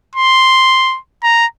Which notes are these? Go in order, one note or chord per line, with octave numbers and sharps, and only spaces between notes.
C6
A#5